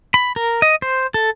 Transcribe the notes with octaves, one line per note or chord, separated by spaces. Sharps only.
B5
A#4
D#5
C5
A4